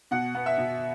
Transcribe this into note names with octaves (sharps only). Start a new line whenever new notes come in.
B2 F#5
B3
E5
B2